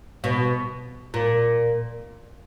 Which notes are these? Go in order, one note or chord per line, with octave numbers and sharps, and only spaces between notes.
B2
A#2